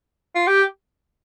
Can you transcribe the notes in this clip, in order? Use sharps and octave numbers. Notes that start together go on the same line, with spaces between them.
F4
G4